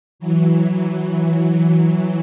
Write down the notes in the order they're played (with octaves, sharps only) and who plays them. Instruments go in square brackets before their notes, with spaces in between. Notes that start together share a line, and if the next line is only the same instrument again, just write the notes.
[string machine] E3 F#3